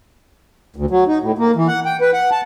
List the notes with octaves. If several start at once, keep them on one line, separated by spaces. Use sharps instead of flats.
D2
F#3
D#4
A2
A#3
E3
F#5
G5
B4
F#5
A5